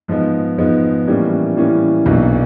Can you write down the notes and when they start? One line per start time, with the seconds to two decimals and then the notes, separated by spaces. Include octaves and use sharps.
0.08 G#2 F3 G#3 B3
0.58 G#2 F3 G#3 B3
1.07 A2 E3 G3 A#3 C#4
1.57 A2 E3 G3 A#3 C#4
2.06 B1 A#2 F#3 B3 D4